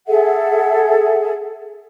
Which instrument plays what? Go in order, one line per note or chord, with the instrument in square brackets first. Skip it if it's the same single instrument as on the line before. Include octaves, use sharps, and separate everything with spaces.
[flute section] G#4 A4 E5 F#5